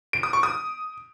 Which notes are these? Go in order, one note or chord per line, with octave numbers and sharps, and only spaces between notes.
D7
D#6
C#6
D#6